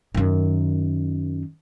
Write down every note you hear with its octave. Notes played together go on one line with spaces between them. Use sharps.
F#2 D#3